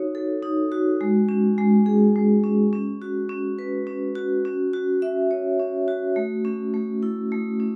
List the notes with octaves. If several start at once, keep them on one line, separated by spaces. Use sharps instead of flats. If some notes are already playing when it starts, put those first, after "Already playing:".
Already playing: D#4 F#4 C#5
A4
D#4
F#4
G#3
C#4
G#3
G#4
G#3
C#4
C#4
F#4
C#4
B4
C#4
F#4
C#4
F#4
E5
C#5
C#4
F#4
A3
C#4
A3
E4
A3
C#4